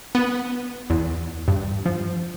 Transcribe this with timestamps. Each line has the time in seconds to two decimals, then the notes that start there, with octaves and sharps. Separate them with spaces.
0.15 B3
0.90 E2
1.48 G2
1.86 F3